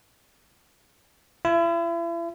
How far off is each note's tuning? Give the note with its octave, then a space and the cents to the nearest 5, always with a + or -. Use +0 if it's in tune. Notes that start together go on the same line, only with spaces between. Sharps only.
E4 +40